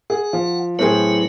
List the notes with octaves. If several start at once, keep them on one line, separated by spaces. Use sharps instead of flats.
G#4 F#5
F3
A2 F#3 C4 E4 G#4 B4